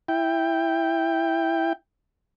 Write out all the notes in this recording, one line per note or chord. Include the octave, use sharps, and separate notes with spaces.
E4 G5